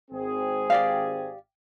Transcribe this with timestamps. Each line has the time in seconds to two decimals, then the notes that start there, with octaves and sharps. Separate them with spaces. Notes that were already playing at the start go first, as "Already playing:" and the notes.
0.11 G#1 C4 G#4
0.70 G4 D5 F5